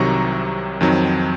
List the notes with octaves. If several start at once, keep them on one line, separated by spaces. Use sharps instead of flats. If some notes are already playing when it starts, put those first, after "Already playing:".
Already playing: C2 C3 D#3 F#3 A#5 C#6
F2 D#3 F#3 C4 D#4